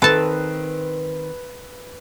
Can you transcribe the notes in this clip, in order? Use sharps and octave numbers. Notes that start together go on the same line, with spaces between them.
D#3 C4 A4 B4 A5